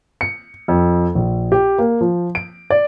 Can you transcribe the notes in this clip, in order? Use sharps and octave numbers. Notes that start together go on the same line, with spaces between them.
C#7
F2
A#1
G4
A#3
F3
D7
D5